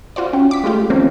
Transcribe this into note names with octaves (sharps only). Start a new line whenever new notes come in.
F4 F#4 C5 D5
C#4 G5
D6 B6
G#3 A3 F4 G4
D#3 F3 A#3 C4 C#4